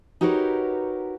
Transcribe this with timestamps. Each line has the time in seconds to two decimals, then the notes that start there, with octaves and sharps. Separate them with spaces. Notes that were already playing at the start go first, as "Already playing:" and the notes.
0.21 D#4 F#4 G4 A#4 B4 C#5